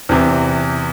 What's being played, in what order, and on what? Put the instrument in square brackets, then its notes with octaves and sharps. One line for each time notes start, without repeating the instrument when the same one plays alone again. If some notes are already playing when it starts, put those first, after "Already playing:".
[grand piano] E2 C3 E3